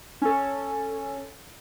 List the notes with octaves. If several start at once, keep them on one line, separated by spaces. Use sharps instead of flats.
C#4 A4